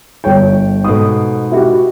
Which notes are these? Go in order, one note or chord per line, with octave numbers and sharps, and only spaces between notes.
G1 C#5 G5
G#2 B2 A4 D#6
E4 F#4 G4